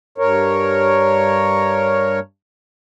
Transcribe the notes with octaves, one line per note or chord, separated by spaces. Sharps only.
G2 A#4 C#5